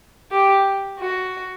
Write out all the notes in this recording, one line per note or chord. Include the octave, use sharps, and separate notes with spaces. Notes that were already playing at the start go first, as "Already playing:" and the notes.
G4
F#4